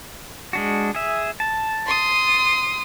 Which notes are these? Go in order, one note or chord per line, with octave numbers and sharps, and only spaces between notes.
G#3 D4 F#4
G#4 E5
A5
C6 D#6